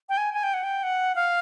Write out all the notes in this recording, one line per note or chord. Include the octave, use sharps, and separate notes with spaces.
G5
G#5
G#5
G5
F#5
G5
F#5
F5